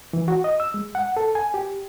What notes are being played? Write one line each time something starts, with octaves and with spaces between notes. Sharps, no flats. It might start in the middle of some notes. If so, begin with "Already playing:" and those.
E3
F#4
D#5
E6
G#3
F#5
A4
G#5
G4